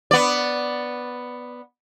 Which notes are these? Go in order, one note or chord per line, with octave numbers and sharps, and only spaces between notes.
B3 D5